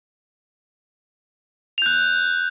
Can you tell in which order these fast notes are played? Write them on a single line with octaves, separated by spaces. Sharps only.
F7 G6 F#6